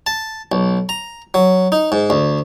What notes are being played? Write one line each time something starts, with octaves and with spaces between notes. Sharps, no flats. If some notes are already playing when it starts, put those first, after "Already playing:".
A5
B1
A#5
F#3
D#4
G#2
D2